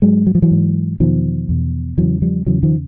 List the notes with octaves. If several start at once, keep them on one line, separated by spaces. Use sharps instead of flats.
G#2 F#3 G#3
F#3
F3
E3 F#3
G#2
E2 B2 D#3 F3
E2 B2
E2 C#3 E3 F#3
F3 G3
E2 C#3 E3 F#3
D#3 F3